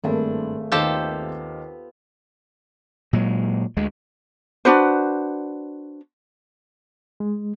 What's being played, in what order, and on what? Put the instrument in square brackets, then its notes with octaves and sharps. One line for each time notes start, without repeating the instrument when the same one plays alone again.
[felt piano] G#1 A3 G#4 [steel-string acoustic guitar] G2 A#3 D4
[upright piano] D#2 D#4 F5 [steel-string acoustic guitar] B3 F4 [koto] G4 A4 C5
[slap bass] A#2 F#3 G#3
D2 G#3
[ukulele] D4 F#4 B4 C5
[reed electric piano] G#3